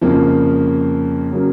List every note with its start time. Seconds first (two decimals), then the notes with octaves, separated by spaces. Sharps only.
0.01 F2 C#3 F3 A#3
1.32 C#3 F#3 A#3